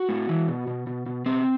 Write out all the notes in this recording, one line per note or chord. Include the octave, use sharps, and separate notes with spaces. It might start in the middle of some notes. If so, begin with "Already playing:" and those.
Already playing: F#4
A2
E3
B2
B2
B2
B2
B2 C4